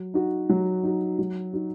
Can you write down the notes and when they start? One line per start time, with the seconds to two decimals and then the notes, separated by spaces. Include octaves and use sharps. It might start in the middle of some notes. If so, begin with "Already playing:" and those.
Already playing: F#3
0.14 D#4 F#4
0.49 F#3
0.84 D#4 F#4
1.19 F#3
1.53 D#4 F#4